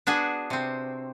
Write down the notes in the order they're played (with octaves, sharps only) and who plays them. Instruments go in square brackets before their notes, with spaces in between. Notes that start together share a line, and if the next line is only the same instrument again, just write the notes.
[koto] B3 D4 F#4 G#4
C3 C4